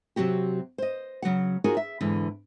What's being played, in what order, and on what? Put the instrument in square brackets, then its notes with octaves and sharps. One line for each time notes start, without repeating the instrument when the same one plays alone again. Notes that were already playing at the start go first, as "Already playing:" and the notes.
[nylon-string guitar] C3 F#3 C4 F#4 G4
C5 D#5
C#3 F#3 F#4 F#5
D#4 F4 F#4 G#4 A#4 C#5
E5
E2 G#2 D3 E3